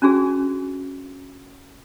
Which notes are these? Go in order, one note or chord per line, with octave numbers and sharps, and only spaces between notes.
C#4 D4 F#4 G#4